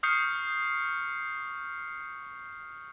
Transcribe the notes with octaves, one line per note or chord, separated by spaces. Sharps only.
C#6 D#6 F6 G6 C7 C#7